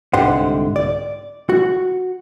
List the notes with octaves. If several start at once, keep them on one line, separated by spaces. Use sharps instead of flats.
C2 G#2 D3 G4 C5 F#5
D5
F#4